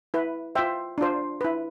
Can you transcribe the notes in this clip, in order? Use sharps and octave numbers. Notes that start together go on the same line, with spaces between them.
E4 B4
F4 C5 E5 G5
D4 F4 C5
E4 B4